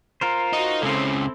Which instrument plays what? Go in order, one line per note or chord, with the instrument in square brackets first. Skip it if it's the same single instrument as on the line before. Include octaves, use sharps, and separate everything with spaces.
[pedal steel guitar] F4 A#4 C5
[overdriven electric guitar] D#4 [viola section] F#4
[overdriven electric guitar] C#2 C#3 [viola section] C4 E4 A4